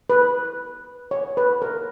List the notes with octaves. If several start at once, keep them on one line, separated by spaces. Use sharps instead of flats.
B4
C#5
B4
A#4